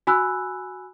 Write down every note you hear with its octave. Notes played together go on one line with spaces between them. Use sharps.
F#4 G#5 B5 E6 F#6